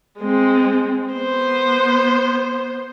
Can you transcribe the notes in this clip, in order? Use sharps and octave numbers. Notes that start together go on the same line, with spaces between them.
G#3 C4
B3 C5